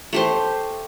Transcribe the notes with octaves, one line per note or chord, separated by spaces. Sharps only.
A3 G4 C5